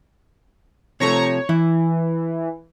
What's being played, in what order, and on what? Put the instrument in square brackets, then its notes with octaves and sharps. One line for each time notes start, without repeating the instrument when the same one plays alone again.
[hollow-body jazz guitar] C3 F3 A3 [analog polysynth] C#5 A#5 C#6
[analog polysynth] C#5
[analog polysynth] E3 [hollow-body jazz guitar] E4